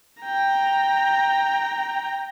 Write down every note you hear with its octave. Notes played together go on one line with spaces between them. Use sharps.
G5 A#5